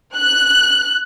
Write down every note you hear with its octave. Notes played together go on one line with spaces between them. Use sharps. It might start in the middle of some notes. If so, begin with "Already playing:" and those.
F#6